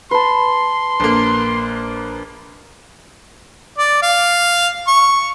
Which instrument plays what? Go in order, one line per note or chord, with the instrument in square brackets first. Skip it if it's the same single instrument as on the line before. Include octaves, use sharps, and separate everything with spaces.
[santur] B4 A5 [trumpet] C6
[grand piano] A#1 A#3
[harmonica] D5
F5
C#6